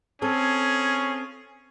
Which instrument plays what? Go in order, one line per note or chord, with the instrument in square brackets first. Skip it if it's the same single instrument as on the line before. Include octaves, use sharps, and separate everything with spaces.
[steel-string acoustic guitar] C4 A4 [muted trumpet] C#4 [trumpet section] F4 G#4